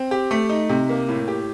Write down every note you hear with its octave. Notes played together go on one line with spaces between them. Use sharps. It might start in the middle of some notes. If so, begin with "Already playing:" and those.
Already playing: C4
G4
A3
D#4
C3
A#3
A2
G4